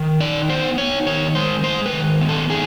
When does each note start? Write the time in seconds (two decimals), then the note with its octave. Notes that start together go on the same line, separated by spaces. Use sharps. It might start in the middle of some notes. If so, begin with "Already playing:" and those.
Already playing: D#3
0.20 D#4 D5
0.49 B3 C5
0.78 D#4 C#5
1.06 D#3 C#5
1.35 G#3 C5
1.63 G#3 C5
1.86 B4
1.93 D#3
2.21 B3
2.29 A4
2.50 D#3 G#4